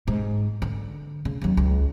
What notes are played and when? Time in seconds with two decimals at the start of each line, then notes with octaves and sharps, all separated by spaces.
0.08 G#2
0.62 D3
1.25 C#3
1.42 D#2 F#3
1.57 C#2